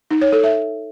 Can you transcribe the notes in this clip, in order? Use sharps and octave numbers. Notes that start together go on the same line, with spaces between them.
D#4
C#5
A4
E5